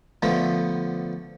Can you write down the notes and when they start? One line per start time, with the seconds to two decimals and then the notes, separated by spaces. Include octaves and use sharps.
0.22 D3 F3 A3 B3